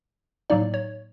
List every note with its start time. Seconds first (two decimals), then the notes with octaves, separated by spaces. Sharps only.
0.50 A2 F#3 A#3 D#4 D5
0.74 C#5